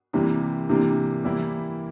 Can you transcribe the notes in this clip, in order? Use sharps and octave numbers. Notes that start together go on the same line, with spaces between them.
C3 E3 G3 A#3
C3 E3 A#3 D4
E3 G3 A#3 E4 G4